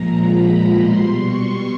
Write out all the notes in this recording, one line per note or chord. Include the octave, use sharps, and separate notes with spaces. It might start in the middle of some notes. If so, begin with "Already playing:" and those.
Already playing: A#2 F3 G#3 A#5
B5
B2 G3 C6
C#6